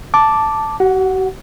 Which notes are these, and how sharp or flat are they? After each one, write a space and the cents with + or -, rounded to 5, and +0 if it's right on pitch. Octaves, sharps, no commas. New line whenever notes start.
A5 +0 D6 +0
F#4 +45 F#5 +0